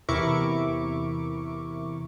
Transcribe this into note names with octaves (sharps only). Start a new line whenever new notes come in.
E2 C3 E4 A#4 C#6 D6